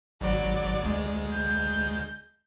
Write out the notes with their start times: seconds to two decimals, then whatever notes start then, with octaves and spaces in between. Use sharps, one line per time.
0.21 G#1 F#3 D5
0.83 D2 G#3
1.32 G6